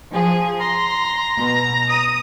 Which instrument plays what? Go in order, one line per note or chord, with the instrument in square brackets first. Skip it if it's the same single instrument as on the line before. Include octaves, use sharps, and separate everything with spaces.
[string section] F3 G#4
[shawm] A#5 [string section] C6
[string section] B2
D#6